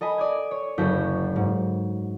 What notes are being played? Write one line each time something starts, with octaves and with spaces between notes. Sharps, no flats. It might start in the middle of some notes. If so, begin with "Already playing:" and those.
A4 D#5 G#5 B5
D5 D#6 G#6
C#5
F#1 D2 F#4 A4 G6 B6
G#2